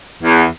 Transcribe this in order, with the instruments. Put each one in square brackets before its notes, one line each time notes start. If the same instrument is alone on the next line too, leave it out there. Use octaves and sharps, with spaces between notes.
[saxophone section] E2